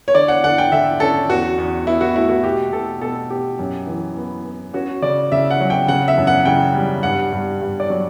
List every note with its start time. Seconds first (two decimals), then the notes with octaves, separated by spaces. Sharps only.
0.08 C#5
0.15 D3 D5
0.28 F#5
0.44 D3 F#5
0.58 G5
0.72 D3 E5
1.00 C#4 A4
1.29 E2 F#4
1.58 E2
1.86 E2 E4
2.01 F#4
2.15 A3 E4
2.29 F#4
2.44 B2 G4
2.72 B2 A4
3.01 B2 A4
3.30 B2 G4
3.59 F#2
3.87 E3
4.17 B3
4.45 B3
4.73 C#4 F#4
5.02 C#3 D5
5.32 C#3 E5
5.51 F#5
5.60 F#3
5.70 G5
5.88 C#3 F#5
6.08 E5
6.17 F#2
6.27 F#5
6.45 C#3 G5
6.75 G3
7.03 G2 F#5
7.32 G2
7.61 G2
7.80 D5
7.90 F#3